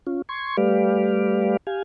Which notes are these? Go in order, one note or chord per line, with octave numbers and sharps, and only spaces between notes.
C#4 F4
C6 C#6 G#6
G3 A3 G4 B4 D5 F5
G4 F5 G#5